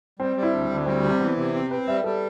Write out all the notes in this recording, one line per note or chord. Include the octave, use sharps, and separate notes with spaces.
G3 C4
G3
E4
D2 D4
D2
G3 C4
C3
E3 B3
C3
C4
C4 B4
G3 E5
G3 A4